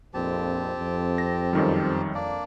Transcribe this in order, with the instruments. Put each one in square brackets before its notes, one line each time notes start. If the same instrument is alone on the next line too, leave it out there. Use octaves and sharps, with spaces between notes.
[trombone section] A#1 F2 [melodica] C4 G4 A5
[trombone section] F2
[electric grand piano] A#6
F#2 D#3 G3
[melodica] A#3 D4 D5